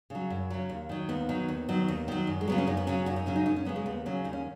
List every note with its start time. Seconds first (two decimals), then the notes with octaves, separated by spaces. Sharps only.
0.10 C#3 F#3
0.30 F#2
0.50 C#3 F#3
0.69 D#2
0.89 D#3 F#3
1.09 D#2 B3
1.29 D#3 F#3
1.48 D#2
1.69 D#3 F#3
1.88 D#2
2.08 D#3 F#3
2.27 F#2
2.41 G#3
2.48 C#3 F#3 B3
2.58 C#4
2.67 F#2 D#4
2.77 B3
2.87 C#3 F#3 C#4
3.06 F#2 F#4
3.16 D#4
3.26 C#3 F#3 C#4
3.36 D#4
3.46 F#2 D#4
3.56 C#4
3.65 F#3 B3
3.69 C#3
3.76 G#3
3.86 D#2 B3
4.06 C#3 F#3 C#4
4.24 D#2 D#4
4.33 C#4